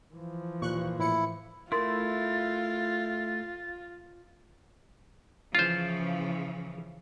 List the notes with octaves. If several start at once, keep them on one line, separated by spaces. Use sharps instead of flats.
E3 F3
D#2 A#2 C#6 F#6
A2 E4 C#7
A3 E4 F4 A#4 C6 A6
C#3 E3 F3 F4 C5